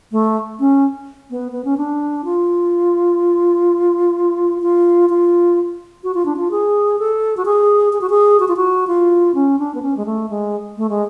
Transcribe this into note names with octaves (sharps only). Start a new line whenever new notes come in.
A3
C#4
B3
B3
C#4
D4
F4
F4
F4
F#4
F4
D4
F4
G#4
A4
F#4
G#4
G#4
F#4
G#4
F#4
F4
F#4
F4
C#4
D4
B3
C#4
G#3
A3
G#3
A3
G#3